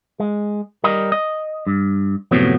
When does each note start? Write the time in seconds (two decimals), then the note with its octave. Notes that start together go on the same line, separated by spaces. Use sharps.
0.20 G#3
0.84 G3 A#4 D#5
1.12 D#5
1.67 G2
2.31 F#2 A2 C3 F3 F#3 B3